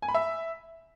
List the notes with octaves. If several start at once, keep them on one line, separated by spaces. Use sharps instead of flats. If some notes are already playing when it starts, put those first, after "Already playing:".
G#5
B5
E5